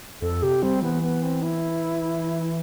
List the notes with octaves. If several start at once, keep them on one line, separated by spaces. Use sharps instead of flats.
F2 A4
C3 G4
G3 C4
E3 B3
B3
C4
E4